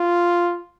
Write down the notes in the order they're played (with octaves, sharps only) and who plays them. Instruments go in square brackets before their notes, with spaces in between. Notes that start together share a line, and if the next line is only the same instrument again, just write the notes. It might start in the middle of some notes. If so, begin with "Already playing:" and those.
Already playing: [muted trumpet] F4